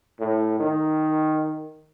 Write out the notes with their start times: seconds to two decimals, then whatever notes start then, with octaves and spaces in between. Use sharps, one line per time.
0.20 A2
0.60 D#3